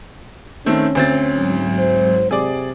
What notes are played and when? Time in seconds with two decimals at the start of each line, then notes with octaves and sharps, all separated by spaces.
0.66 D#3 A3 C4 C#4
0.95 D2 C4 A6
1.31 G#2 F#3
1.78 C5
2.31 C3 G#4 D5